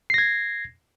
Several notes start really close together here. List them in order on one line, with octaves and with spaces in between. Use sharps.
C7 A#6 G#6